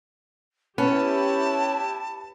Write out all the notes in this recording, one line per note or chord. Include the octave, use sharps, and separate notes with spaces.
B3 C#4 E4 G4 A5